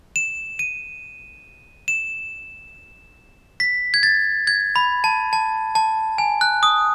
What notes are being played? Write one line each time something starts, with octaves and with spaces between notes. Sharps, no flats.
E7
D#7
E7
B6
G#6
A6
G#6
B5
A5
A5
A5
G#5
F#6
D#6